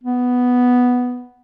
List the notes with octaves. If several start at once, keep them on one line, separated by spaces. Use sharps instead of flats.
B3